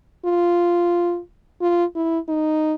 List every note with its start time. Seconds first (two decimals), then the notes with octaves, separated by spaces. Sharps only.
0.25 F4
1.61 F4
1.95 E4
2.29 D#4